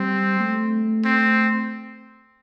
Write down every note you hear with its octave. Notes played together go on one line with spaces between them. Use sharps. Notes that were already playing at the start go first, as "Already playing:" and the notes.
Already playing: G3 C4
A3
C4